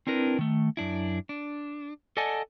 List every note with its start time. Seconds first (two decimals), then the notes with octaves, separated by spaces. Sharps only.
0.07 C4 D4 E4 A#4 B4
0.39 D#3 A3
0.77 F#2 D4 E4
1.29 D4
2.17 A4 D5 D#5 F#5 G#5 A5